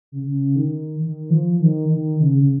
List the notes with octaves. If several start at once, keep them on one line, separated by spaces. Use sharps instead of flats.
C#3
C#3
D#3
D#3
F3
D#3
D#3
C#3
C#3